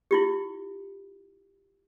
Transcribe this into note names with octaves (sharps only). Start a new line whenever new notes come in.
E4 F4 G4